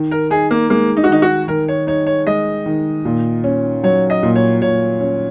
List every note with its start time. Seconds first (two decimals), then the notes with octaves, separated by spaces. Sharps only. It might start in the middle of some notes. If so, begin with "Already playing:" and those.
Already playing: D#3
0.11 A#4
0.30 D#4 G#4
0.51 A#3
0.70 G#3 A#3
0.97 D#4
1.04 F#4
1.09 D#3 D#4
1.22 F#4
1.48 D#3 A#4
1.68 C#5
1.87 D#4 C#5
2.06 C#5
2.27 G#3 D#5
2.66 D#3
3.05 A#2
3.44 C#4
3.83 F#3 C#5
4.10 D#5
4.23 A#2
4.36 C#5
4.62 A#2 C#5
5.01 C#4